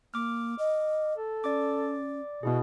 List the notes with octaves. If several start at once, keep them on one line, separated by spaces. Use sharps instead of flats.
A#3 D6 F6
D#5
A4
C#4 D5 D6
B2 B3 E4 G#4